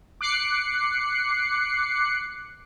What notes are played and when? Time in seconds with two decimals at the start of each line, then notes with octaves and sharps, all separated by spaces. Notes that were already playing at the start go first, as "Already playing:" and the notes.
0.21 D6 F#6 C7 C#7